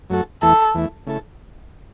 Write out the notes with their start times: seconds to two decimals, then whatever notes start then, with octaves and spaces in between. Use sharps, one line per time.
0.10 F#2 F#3 A3 F#4 A4
0.42 E2 E3 A3 E4 A4
0.75 E2 E3 A3 E4
1.07 C#3 A3 E4 A4